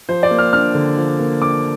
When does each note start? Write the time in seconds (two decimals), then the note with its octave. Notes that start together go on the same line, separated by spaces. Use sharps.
0.09 F3 C5
0.23 D5
0.31 A#3
0.39 F6
0.53 D4 F6
0.74 D3
0.97 F3
1.19 A#3
1.42 D4 D6